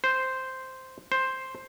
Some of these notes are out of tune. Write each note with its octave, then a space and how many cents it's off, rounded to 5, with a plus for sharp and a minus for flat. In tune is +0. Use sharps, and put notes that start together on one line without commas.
C5 -5
C5 +5